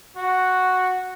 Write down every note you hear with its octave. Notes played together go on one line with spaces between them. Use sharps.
F#4